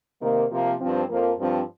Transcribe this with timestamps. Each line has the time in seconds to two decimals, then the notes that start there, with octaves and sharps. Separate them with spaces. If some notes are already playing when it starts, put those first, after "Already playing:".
0.21 C3 D#3 A#3
0.51 C3 F3 A#3
0.80 G2 F3 C4
1.09 F2 F3 A#3
1.38 G2 F3 C4